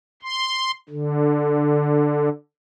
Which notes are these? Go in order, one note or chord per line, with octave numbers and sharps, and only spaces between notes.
C6
D3